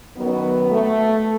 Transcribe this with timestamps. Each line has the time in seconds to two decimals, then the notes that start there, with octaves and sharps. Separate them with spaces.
0.16 F#2 D#3 F#3 B3
0.72 A3